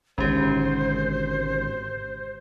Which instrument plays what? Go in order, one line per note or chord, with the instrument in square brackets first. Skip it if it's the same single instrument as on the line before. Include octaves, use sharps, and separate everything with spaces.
[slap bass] G#1 B2 D3 [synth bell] G#3 G4 [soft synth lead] C#4 [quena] C5